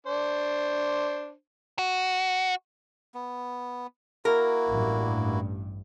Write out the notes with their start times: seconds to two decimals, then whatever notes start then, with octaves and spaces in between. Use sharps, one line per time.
0.07 D4 C5
1.79 F#4
3.14 B3
4.25 A#3 E4 F#4 A#4
4.69 A1 G2